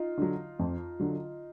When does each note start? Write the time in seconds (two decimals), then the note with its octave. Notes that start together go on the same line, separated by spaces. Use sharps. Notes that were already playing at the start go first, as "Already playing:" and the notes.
Already playing: D#4 F4
0.17 D3 F#3
0.59 F2
1.00 D3 F#3